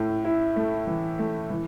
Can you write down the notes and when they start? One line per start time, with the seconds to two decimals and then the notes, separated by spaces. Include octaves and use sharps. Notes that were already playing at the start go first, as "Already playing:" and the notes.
Already playing: A2 A3
0.25 E4
0.56 A3
0.87 E3
1.19 A3
1.50 E3